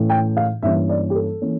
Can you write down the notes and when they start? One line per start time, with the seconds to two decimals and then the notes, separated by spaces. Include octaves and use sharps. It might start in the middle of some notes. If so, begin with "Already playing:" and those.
Already playing: A2 E3 A3 C#4
0.10 G5
0.37 F5
0.62 G2 E3 A#3 C#4 E5
0.89 D5
1.10 G4
1.15 A4
1.41 E3 A#3 C#4